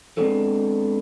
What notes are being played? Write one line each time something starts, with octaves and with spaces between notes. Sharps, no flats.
G#3 B3 C4 D4 G#4 A4